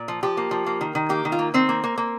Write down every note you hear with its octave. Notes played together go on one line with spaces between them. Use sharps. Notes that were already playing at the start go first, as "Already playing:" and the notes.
Already playing: A#2
F3
F3 G4
A#3
F3
A#3
D#3
D#3
A#3 G4
D#3
F4
A#3
D#3 C4
A#3
A#3
A#3